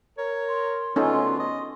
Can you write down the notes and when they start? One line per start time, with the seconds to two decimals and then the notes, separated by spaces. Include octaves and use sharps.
0.18 A#4 C#5
0.48 C6
0.96 D2 D3 B3 C#4 D#4 F4 A4
1.40 D#5